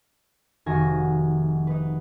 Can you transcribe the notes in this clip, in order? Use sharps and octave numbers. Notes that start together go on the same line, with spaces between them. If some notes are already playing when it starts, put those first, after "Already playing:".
F1 D#3 F#4 G#5 A#6
D#4 B4